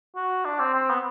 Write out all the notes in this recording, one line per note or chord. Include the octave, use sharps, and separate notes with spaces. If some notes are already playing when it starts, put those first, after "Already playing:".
F#4
D4
C4
C4
B3